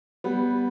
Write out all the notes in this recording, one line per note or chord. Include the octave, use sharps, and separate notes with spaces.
G3 B3